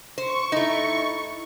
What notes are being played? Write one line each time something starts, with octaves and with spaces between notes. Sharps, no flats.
C5 C#6
A3 D#4 E4